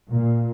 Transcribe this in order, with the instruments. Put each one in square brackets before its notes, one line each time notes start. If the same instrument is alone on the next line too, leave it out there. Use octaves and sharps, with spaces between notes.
[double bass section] A#2